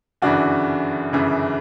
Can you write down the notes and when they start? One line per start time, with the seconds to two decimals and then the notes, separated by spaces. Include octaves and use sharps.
0.22 G1 F#2 C#3 E3 D4 F#4
1.13 G1 F#2 C#3 E3